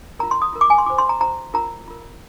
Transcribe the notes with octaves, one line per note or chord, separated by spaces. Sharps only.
F4 A#4 A#5
C6
D#6
F4 A#4
D6
G#5
C6
F4 C5 D6
C6
A#5
F4 C5 A#5
F4 A#4 A#5
F4 A#4